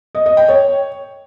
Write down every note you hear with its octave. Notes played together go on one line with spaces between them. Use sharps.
D#5
D#5
G5
C#5